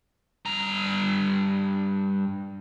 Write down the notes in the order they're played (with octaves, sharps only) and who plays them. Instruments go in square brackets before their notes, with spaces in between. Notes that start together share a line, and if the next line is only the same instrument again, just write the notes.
[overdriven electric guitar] G2 A#5